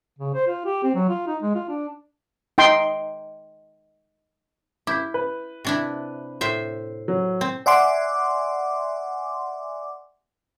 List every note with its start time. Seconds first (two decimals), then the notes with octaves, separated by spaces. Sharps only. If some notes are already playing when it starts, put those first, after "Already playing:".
0.19 C#3
0.34 C5
0.48 F4
0.66 G4
0.83 C4
0.95 F#3
1.09 F4
1.27 D#4
1.42 G#3
1.55 F4
1.69 D4
2.58 D#4 G5 C6
4.87 E4 D6 G6 B6
5.14 B4
5.65 C3 D4 E4
6.41 A2 C5 E5
7.08 F#3
7.41 C4
7.66 D5 E5 F#5 G#5 C6 D6